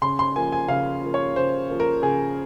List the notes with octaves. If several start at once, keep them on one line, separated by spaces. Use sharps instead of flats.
C#3 C6
C6
F3 A#3 G#5
G#5
C#3 F5
F3 A#3
C#5
C#3 C5
F3 A#3
A#4
C#3 G#4